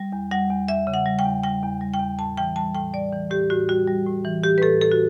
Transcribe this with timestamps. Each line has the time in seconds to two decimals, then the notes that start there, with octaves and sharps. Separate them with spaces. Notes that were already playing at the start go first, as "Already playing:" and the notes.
Already playing: G3
0.12 E2
0.31 G3 F#5
0.50 E2
0.68 E2 E5
0.87 C#3
0.94 F#5
1.06 G3
1.19 G5
1.25 E2
1.44 G3 G5
1.62 E2
1.81 G3
1.94 G5
2.00 E2
2.19 A2 A5
2.37 E3 G5
2.56 G3 A5
2.75 A2 G5
2.94 G3 D5
3.13 E3
3.31 A2 G4
3.50 A2 F#4
3.69 G3 F#4
3.87 G3
4.06 A2
4.24 E3
4.44 A2 G4
4.58 B4
4.62 A2 A4
4.81 A2 A4
4.92 F#4